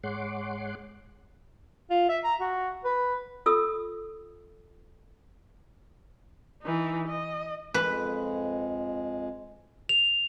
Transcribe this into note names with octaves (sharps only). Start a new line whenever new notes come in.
G#2 G#3 C#5 F#5 C6 D6
F4
E5
A#5
F#4
B4
F4 A4 D#6 E6
E3 D#4
D#5
F2 G#3 B4
F7